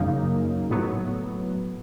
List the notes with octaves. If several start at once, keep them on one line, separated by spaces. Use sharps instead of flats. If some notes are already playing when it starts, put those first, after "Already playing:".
Already playing: F#2 C#3 F#3 A#3 D#4
A2 F#3 B3